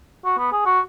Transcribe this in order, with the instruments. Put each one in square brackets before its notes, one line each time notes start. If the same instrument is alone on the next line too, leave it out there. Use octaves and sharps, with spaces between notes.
[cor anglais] F#4
B3
G#4
F#4